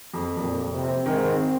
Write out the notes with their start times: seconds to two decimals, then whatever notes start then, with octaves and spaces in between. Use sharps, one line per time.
0.14 F2
0.37 F2 A#2
0.60 F2
0.70 C3
0.83 C4
1.06 G#2 D#3
1.28 C4